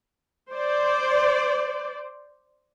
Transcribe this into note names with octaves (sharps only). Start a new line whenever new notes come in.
C5 D5